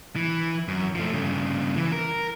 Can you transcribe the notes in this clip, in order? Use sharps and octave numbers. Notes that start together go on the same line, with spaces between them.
E3
F#2
F3 A3
G2 C#3
E3
A#4